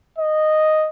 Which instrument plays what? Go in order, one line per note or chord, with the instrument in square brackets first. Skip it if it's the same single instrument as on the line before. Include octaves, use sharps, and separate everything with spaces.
[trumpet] D#5